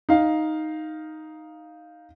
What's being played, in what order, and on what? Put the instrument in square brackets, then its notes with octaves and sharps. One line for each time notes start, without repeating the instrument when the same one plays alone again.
[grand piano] D#4 F5